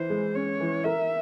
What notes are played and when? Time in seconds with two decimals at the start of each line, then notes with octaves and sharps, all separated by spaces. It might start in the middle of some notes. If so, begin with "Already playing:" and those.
Already playing: E3 E4 C5
0.10 G#3
0.35 C#4 C#5
0.60 E3
0.84 A#4 E5